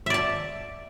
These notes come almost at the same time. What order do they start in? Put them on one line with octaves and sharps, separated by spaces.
E5 D5 A5